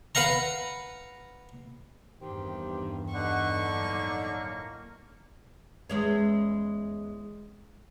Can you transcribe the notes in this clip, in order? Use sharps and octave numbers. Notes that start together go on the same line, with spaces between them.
B4 F5 F#5 A#5
E2 G2 D#3 C4 G4
D3 D#4 F#5 C#6
A2 F#3 A#3
E2 G#3 C#4